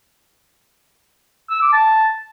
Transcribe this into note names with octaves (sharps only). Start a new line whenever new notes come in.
E6
D6
A5